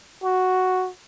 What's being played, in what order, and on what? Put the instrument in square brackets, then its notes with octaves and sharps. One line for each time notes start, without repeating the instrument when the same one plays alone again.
[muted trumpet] F#4